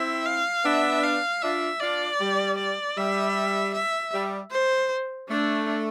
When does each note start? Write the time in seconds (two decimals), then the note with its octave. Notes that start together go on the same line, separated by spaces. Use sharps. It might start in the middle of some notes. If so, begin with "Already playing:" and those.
Already playing: C4 E4 E5
0.26 F5
0.64 B3 D4 E5
1.03 F5
1.42 D4 F4 E5
1.80 D4 F4 D5
2.20 G3
2.58 D5
2.97 G3 E5
3.74 E5
4.13 G3
4.51 C5
5.30 A3 D4